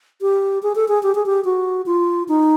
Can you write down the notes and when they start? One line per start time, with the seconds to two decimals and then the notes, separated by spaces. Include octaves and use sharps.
0.21 G4
0.63 G#4
0.75 A4
0.88 G#4
1.03 G4
1.15 G#4
1.26 G4
1.45 F#4
1.86 F4
2.28 D#4